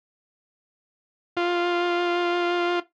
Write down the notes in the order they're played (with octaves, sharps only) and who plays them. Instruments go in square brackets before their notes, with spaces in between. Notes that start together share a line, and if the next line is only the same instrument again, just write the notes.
[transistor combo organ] F4